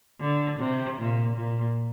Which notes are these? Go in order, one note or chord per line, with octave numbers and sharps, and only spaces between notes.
D3
C3
A#2
A#2